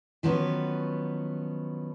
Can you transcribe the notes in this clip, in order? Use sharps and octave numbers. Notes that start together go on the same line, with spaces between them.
D#3 F3 F#3 B3 C#4 B4